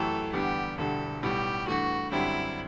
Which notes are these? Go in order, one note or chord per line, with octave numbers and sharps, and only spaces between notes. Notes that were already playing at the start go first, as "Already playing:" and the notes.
Already playing: F#2 E3 A3 E4 G4 A4
E2 D3 G3 B3 G4
E1 D2 D3 G3 A4
B1 A2 G3 B3 G4
G2 E3 A3 F#4
F#2 D3 G3 C4 E4